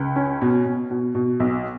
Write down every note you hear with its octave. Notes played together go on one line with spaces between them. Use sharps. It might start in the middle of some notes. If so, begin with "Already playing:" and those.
Already playing: C#2
C#4
B2
B2
B2
B2
B1